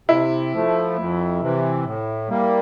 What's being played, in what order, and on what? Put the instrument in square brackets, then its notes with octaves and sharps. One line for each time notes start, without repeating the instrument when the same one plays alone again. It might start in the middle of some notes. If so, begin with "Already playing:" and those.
[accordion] C3 [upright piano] E4
[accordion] F3 A3
F2
C3 E3
A2
G3 A#3